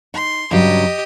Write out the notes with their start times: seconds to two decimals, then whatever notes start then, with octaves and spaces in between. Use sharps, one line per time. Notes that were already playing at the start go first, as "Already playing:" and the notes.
0.14 D#4 C6
0.51 G2 C#3 F#3 G4 D#5